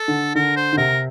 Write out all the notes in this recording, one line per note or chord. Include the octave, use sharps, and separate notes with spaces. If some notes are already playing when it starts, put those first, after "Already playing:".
Already playing: A4
D3
D3 A#4
C5
D3
C3 A#4